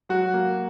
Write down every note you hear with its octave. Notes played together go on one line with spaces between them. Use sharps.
F#3 F#4
A#3